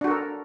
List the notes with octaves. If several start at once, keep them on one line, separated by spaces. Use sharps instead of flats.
D4 F#4 A4 A#4